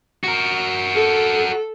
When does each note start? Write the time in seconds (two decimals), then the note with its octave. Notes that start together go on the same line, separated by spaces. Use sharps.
0.24 F#4 A#4
0.95 A4